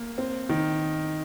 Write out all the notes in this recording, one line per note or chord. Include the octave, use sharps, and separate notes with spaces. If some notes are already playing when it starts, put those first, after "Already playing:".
Already playing: A#3
C4
D#3